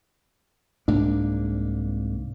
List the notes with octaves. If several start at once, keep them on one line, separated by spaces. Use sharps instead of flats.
C2 G#2 A#3 D4